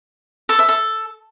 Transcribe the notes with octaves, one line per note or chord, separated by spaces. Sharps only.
A4
E5
A4